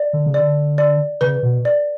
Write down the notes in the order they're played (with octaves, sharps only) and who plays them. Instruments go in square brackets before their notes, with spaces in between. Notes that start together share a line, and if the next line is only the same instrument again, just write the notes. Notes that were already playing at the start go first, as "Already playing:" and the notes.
Already playing: [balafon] D5
[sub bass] D3
C#3
[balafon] D5
[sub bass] D3
[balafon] D5
[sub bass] C#3 [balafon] B4
[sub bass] B2
[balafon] D5